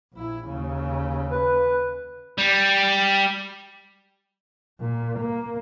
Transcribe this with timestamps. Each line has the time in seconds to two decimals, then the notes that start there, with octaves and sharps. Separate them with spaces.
0.13 A#1 E4
0.48 D#2 C#3
1.30 B4
2.38 G3
4.80 A#2
5.19 A#3